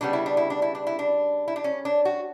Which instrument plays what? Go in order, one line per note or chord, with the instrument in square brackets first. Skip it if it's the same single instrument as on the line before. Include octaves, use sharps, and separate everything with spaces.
[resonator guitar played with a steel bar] C#3 G3 B3 D4
E4
D4
E4
D4
E4
D4
E4
D4
E4
D4
C#4
D4
F#4